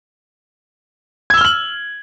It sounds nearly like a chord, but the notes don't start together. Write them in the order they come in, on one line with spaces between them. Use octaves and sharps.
G#6 E6 G7 F6 F#7